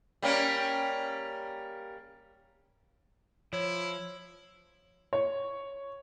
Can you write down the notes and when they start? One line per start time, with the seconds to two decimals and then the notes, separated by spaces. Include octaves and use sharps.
0.22 G3 A#3 C#4
3.53 F3 E4 C#5
5.13 C#5